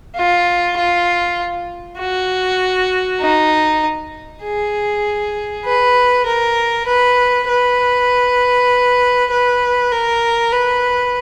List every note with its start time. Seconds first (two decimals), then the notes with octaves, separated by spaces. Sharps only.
0.16 F4
0.77 F4
1.99 F#4
3.21 D#4
4.44 G#4
5.65 B4
6.26 A#4
6.87 B4
7.48 B4
9.31 B4
9.92 A#4
10.53 B4